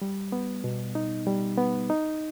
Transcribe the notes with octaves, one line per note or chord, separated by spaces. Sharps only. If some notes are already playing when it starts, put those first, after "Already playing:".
G3
B3
B2
D#4
G3
B3
D#4